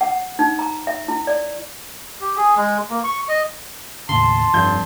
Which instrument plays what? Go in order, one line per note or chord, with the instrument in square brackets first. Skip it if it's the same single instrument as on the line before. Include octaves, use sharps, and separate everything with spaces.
[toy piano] F#5
D#4
A#5
E5
E4
D5
[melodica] G4
G#4
G#3
A#3
C#6
D#5
[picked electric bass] D#2 A2 C#3 [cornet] A5 [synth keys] C6
[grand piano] F1 G6 [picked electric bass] G2